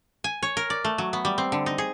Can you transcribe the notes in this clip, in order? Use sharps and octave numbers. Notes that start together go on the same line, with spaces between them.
G#5
C#5
A#4
D5
A3
F#3
B3
G3
C4
D3
D#4
G#4